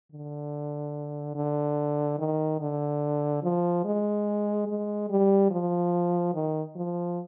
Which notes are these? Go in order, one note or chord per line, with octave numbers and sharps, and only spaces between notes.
D3
D3
D#3
D3
F3
G#3
G#3
G3
F3
D#3
F3